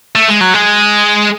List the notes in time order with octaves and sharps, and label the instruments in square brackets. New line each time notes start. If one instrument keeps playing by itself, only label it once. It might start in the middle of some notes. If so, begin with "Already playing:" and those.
[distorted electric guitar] A3
G#3
F#3
G#3